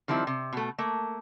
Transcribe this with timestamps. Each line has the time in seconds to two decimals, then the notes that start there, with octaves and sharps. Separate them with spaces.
0.08 D#3 F3 G3 C4 E4
0.27 C3
0.53 B2 A3
0.78 A3 A#3